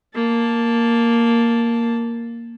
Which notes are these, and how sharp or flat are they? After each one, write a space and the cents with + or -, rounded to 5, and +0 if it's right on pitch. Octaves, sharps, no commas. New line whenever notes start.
A#3 +0 A5 +0